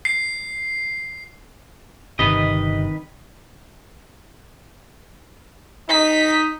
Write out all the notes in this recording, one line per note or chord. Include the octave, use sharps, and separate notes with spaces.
C7
G1 C3 D#3 B4 D#5
D#4 B6